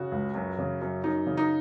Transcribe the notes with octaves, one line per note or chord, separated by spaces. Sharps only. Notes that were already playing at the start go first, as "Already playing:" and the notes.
Already playing: C#3 F#4
C#2
F#2
C#3
F#2
F#2 D#4
C#3
D#4